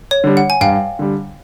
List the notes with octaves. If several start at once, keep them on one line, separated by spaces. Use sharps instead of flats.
C#5
D3 G3
F#5
G#5
G2 F5 G5
D3 G3